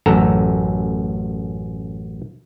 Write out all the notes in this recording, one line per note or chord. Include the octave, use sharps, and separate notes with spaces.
A1 F#2 A4 A#5